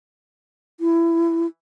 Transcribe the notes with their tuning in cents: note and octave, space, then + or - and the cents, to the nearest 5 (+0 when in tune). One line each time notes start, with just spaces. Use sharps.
E4 +20